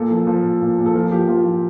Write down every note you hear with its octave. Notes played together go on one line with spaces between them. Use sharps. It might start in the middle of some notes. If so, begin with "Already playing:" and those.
Already playing: A#2 A4
F3
F3
A#2
A#2
A#2
A4
F3 A#4
F3 G4
F3 F4
F3